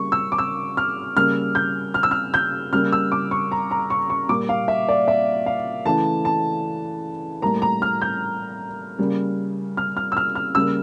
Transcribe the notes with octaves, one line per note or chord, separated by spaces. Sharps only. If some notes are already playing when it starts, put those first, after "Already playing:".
Already playing: C#3 G3 A#3 C#6
E6
D6
E6
F6
C#3 G3 A#3 F6
G6
F6
E6
F6
G6
C#3 G3 A#3 F6
E6
D6
C#6
A#5
A#5
C#6
C#6
A#2 G3 A#3 D6
F5
E5
D5
E5
F5
C#3 E3 A3 A5
A5
A2 G3 A#3 A#5
A#5
F6
G6
C#3 G3 A#3
F6
F6
E6
F6
F6
C#3 G3 A#3 E6